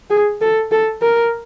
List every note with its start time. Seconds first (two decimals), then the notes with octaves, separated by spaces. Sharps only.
0.10 G#4
0.41 A4
0.72 A4
1.02 A#4